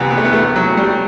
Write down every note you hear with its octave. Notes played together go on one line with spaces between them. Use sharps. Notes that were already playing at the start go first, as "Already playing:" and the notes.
Already playing: C2 C3 E3 B3
B3
A3
B3
A3
F#3
G3